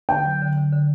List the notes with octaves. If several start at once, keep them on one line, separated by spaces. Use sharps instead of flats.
D3 G5
F#3
D3
D3
D3